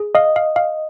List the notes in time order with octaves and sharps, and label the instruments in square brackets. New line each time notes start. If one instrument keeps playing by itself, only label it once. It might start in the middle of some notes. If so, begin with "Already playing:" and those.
Already playing: [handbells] G#4
[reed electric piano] D#5 [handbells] F5
[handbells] F5
F5